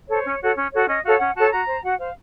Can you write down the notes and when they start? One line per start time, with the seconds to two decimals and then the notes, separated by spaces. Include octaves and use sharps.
0.08 A4 C5 C#5
0.25 C#4
0.41 F#4 A4 C#5
0.56 C#4
0.73 F#4 A4 C#5
0.88 C#4 D#5
1.04 F#4 A4 C#5 F5
1.19 C#4 F#5
1.35 F#4 A4 C#5 A5
1.51 F#4 A#5
1.68 C5
1.83 F#4 F#5
1.99 C5 F5